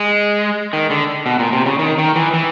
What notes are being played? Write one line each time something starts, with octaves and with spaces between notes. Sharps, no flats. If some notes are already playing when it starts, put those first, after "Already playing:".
Already playing: G#3
D#3
D3
B2
A#2
C3
C#3
D#3
D#3
E3
E3